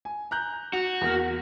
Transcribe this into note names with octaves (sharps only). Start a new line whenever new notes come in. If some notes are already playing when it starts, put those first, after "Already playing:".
G#5
A#5 F#6 G6
F#4 F7
E2 A#3 F6